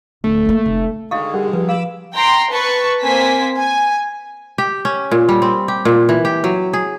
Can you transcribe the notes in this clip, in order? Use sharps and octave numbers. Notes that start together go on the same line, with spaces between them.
D1 A3
A#3 B3
F1
D3 D#3 G#3 F#4 D#5 F5 C#6 D#6
G3 G#4 A#4 F#5
F3 B4
F5 B5 D6 E6
G5 A#5 C6
B4 A5 C#6
A#3 C4 C5 G#5 B6
G#5
G4
C#4
A#2
G3
C4
G4
A#2
E3
G4
F#3
G#4